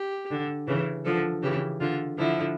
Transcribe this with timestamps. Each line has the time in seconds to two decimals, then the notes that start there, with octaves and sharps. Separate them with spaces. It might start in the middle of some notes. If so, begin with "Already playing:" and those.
Already playing: G4
0.30 D3
0.67 C#3 E3
1.05 D3 F3 A4
1.42 C#3 E3 G4
1.80 D3 F4
2.18 D3 F3 E4